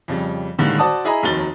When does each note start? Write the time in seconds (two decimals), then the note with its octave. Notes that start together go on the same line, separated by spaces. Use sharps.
0.08 F2 C#3 G3
0.58 A2 D3 D#3 G3 G#3 A#3
0.79 F#4 C5 D5 A5 D6 D#6
1.05 E4 G#4 D#5 G#5 A#5 B5
1.23 F1 D#2 D#3 F#3 A6 G7